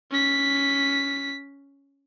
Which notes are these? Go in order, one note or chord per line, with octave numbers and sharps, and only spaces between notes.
C#4 B6